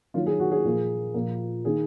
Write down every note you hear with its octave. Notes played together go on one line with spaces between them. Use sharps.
D#3 F#3 A#3 F4
G#4
F#4
G#4
A#2 F3 A#3
A#2 F3 A#3
D#3 A#3 G#4